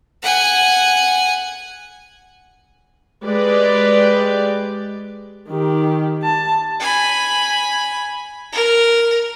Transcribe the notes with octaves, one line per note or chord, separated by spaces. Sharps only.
F#5 G#5
G#3 G4 B4 D5
D#3 G4
A5
G#5 B5
A#4